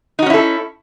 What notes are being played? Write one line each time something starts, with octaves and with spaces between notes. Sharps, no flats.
C#4 D#4 E4 F#4 A4